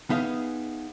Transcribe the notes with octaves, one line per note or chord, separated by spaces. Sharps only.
B3 D#4 G#4 E5 F5